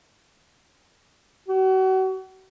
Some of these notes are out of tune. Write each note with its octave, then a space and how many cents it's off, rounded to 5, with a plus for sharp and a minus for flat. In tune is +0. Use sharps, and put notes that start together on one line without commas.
F#4 +35